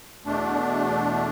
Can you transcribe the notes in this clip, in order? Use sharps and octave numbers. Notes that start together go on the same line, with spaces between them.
E2 B2 A3 D4